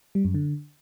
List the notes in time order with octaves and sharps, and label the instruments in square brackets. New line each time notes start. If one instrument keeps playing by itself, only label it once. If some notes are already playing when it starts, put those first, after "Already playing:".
[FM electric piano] G3
F#2
D3